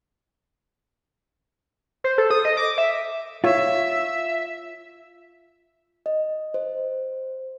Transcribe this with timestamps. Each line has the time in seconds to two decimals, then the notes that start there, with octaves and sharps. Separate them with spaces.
2.04 C5
2.18 A4
2.31 D#6
2.45 D#5
2.57 D6
2.78 E5
3.44 F4 C#5 E5
6.06 D#5
6.54 C5